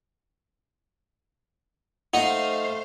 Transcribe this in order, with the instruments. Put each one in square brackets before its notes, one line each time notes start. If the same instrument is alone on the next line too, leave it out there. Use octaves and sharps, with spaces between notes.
[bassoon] A3 [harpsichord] D#4 [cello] C5 F5 [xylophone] F#5